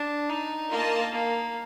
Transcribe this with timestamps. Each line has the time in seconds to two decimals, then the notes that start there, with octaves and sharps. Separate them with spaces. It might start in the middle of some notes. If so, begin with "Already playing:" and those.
Already playing: D4
0.30 D#4
0.71 A#3 F4 A#4 D#5 A5
1.12 A#3